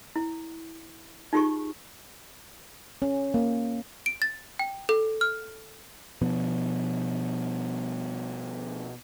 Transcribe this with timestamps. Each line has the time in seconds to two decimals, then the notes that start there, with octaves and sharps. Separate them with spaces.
0.16 E4
1.33 D#4 F4 G4 G#4 C#6
3.02 C#4
3.34 A#3
4.06 D7
4.22 A6
4.59 G5
4.89 A4
5.21 F6
6.22 B2 F3 B3